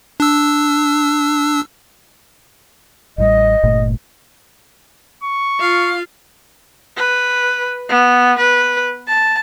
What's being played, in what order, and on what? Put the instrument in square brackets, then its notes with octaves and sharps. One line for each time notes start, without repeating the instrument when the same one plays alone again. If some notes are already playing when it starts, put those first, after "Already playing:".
[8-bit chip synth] D4 E6
[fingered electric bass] A1 A2 G3 [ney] D#5
[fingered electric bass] G1 A#2 A3
[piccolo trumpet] C#6
[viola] F4 F5
[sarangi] B4
B3
B4
A5